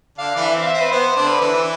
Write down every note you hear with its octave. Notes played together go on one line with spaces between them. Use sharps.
D3 D4 F5
E3 E4
E5
C4
F5
E5
C4
B4
B3 C5
D3 D4
B4
E3 E4